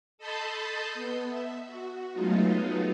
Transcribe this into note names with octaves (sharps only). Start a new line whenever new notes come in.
A4 D#5 A5 B5 C6 G6
B3
E5
F#4
F#3 G#3 A3 B3 D#4 F4